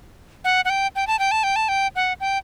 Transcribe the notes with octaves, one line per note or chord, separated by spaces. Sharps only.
F#5
F#5
G5
G5
A5
G5
A5
G5
A5
G5
F#5
G5